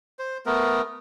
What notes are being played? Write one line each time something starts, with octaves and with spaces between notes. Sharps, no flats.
C5
A3 B3 A#4